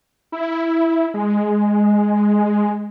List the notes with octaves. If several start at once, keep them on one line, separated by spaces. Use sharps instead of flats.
E4
G#3